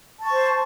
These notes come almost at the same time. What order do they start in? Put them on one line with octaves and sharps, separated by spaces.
A5 C#6 C5